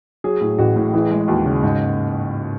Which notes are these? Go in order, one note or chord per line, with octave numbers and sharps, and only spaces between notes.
F#3 G#4
A2
A1 F#4
A2
E3 G#4
G#3
D#2 F#4
C#3
G#2